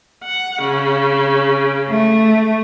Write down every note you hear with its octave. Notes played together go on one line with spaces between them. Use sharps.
F#5
C#3
A3